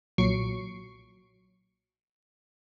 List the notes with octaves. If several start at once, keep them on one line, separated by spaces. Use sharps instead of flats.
B1 A#2 F#3 C#6 C7 D7